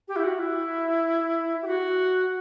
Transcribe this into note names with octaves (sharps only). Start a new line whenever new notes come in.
G4
E4
F#4
E4
G4
F#4